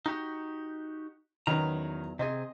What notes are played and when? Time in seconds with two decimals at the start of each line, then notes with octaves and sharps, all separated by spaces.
0.06 D#4 F#4 G4
1.47 E2 D#3 F#3 C#4 B4 A#5
2.19 C3 C4 G#4 D#5